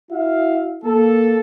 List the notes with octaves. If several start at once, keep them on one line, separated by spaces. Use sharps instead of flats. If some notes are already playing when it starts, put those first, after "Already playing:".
E4 F#4 E5 F5
A#3 A4